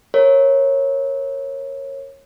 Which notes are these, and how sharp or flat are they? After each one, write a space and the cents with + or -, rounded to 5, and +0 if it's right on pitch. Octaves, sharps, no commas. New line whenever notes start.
A#4 +0 C#5 -20